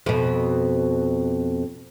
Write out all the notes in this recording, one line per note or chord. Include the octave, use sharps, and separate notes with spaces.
F2 B2